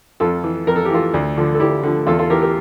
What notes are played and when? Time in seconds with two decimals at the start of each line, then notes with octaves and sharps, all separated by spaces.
0.20 F2 F4 A4
0.43 E3
0.67 F2 A#4
0.76 A4
0.85 G4
0.90 E3 F4 A4
1.14 D2
1.37 D3 F3
1.54 A4
1.60 D2 E4 G4
1.83 D3 F3
2.07 E2 F4 A4
2.19 F4 A4
2.30 E3 G4 A#4
2.42 G4 A#4